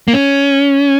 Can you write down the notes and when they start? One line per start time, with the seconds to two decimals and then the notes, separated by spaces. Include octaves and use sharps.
0.08 A#3
0.13 C#4